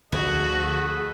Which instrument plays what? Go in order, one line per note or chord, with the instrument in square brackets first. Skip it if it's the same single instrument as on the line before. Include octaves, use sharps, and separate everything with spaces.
[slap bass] D2 D3 F3 [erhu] F#4 [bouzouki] G#4 [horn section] A4 B4 D#5